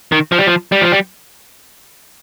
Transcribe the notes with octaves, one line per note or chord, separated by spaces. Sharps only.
D#3
F3
G3
F3
G3
F3
G3